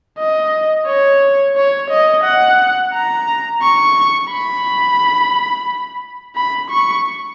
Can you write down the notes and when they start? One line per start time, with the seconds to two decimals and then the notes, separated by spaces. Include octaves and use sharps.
0.18 D#5
0.87 C#5
1.56 C#5
1.90 D#5
2.24 F#5
2.93 A#5
3.62 C#6
4.30 B5
6.35 B5
6.70 C#6